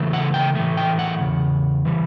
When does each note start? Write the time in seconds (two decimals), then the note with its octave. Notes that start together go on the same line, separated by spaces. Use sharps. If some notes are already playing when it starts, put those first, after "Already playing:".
Already playing: C#3 E3 A3
0.13 F#5
0.34 G5
0.55 A2 E3 A3
0.77 G5
0.99 F#5
1.20 E2 C#3
1.85 E3 G3